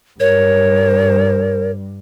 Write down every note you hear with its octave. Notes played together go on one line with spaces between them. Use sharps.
G2 A#4 C#5